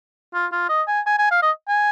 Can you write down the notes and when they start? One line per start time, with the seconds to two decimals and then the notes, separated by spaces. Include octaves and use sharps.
0.34 F4
0.52 F4
0.69 D#5
0.88 G#5
1.06 G#5
1.18 G#5
1.31 F5
1.42 D#5
1.68 G#5